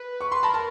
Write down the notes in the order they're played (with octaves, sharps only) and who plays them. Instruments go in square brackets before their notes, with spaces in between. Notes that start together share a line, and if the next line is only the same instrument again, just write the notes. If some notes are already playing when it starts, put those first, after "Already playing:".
Already playing: [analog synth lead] B4
[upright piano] C#6
C6
[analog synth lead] A#4 [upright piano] A5 B5
[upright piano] A5